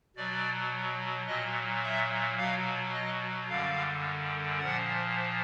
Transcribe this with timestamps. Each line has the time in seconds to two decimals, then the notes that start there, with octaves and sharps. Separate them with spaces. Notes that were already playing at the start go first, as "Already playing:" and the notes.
0.16 B2 F#3 D5
1.27 A#2 F#3 D#5
1.83 E5
2.38 B2 F#3 F5
2.93 D#5
3.49 F#2 D3 G3 F5
4.60 A#2 F3 F#5